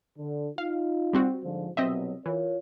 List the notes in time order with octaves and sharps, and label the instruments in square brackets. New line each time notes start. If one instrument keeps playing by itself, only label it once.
[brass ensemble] D3
[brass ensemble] D#4 F4 [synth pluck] F5
[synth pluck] G3 C4 F#4
[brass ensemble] G#2 D3 F3
[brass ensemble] C2 B2 F#3 [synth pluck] C4 D#5 E5
[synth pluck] E3 [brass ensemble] F4 A#4 C#5